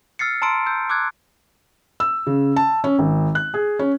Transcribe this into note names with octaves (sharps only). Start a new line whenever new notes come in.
E6 F6 A6 C7 C#7
A5 A#5 C6 E6 D7
E6 G6
D6 E6 F#6 G#6
E6
C#3
A5
C#4
G#1
F#6
G#4
C#4